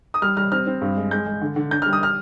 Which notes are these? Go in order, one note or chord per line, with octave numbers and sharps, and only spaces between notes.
D#6
G3 F6
G3 F6
C4 F6
C4
G2
G#3
G#3 G6
G#3
D3
D3
D4 G6
G3 F6
D#6
F6